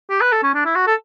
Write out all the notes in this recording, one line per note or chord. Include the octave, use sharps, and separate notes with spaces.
G4
B4
A4
C#4
D4
E4
F#4
A4